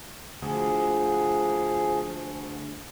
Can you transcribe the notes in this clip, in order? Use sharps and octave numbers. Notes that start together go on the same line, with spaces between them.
D2 F3 G#4